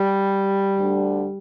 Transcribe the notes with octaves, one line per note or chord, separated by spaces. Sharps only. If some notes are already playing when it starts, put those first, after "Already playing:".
Already playing: G3
D2 D3